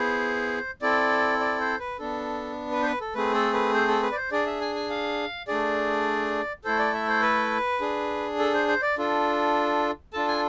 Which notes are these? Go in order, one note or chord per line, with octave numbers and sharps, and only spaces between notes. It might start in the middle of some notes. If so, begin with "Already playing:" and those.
Already playing: B3 E4 G#4 C5
C4 E4 A4 D5
D5
C5
B4
B3 D4 A4
B4
C5
B4
A4
A3 C4 G#4 B4
A4
B4
C5
A4
B4
D5
C5
D4 G#4 D5
E5
G#5
G#5
F5
A3 D4 G#4 D5
A3 E4 A4 C5
D5
E5
C5
B4
D4 G#4
A4
C5
C5
D5
D4 F4 A4
D4 F4 A4 A5
G#5